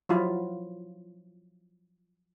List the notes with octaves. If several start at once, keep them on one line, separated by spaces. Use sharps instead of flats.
F3 F#3 E4 F4